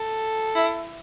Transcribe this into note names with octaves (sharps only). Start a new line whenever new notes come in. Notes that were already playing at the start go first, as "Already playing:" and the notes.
Already playing: A4
E4